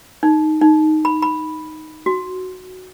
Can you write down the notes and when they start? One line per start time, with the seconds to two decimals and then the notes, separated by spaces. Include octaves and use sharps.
0.23 D#4
0.61 D#4
1.05 B5
1.22 B5
2.06 F#4